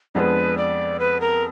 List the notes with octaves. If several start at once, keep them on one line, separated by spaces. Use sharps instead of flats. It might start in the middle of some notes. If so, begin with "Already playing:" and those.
F2 F3 G#3 B3 D4 B4 D5
D5
B4
A#4